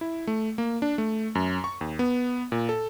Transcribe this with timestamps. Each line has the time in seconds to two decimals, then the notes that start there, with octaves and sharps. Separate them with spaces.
0.01 E4
0.27 A3
0.58 A#3
0.82 D4
0.98 A3
1.35 F#2
1.64 C#6
1.81 D#2
1.99 B3
2.52 A#2
2.69 A4